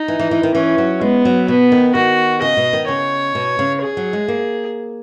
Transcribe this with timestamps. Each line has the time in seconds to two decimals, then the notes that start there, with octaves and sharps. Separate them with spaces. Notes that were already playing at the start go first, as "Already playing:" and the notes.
Already playing: D#4
0.08 E3
0.19 E3
0.31 E3
0.43 D#3
0.54 E3 C#4
0.78 F#3
1.01 G#3 B3
1.25 F#3
1.48 B2 B3
1.72 D#3
1.95 D#3 F#4
2.42 C#3 D#5
2.57 B2
2.73 D#3
2.88 C#3 C#5
3.35 B2
3.59 C#3
3.82 G#4
3.97 F#3
4.13 G#3
4.28 A#3